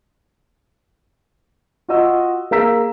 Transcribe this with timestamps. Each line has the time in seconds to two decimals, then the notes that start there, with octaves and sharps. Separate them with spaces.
1.88 F4 F#4 D#5 E6
2.51 A#3 G#4 F5 A#5 E6 B6